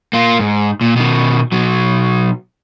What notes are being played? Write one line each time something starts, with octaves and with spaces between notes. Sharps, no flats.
A#3 F4
G#2
A#2
B2 D#3
B2 F#3